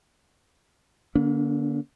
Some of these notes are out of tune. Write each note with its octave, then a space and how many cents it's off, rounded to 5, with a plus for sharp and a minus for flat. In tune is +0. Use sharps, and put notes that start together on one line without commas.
D3 +0 A#3 +25 D4 -45